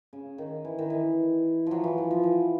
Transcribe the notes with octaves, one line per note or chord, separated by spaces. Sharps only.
C#3
D#3
E3
D#3
E3
F3 F#3
E3
F3
F3
E3